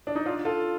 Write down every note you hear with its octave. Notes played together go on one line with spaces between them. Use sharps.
D4
D#4
D4 F4
F4 A4